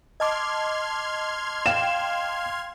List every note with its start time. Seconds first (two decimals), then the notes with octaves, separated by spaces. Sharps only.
0.20 D#5 A5 C6 D6 F6 G#6
1.66 F5 G5 E7